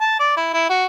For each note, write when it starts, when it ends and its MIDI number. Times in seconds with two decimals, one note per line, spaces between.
0.01 0.17 81
0.20 0.36 74
0.37 0.51 64
0.53 0.69 64
0.70 0.86 66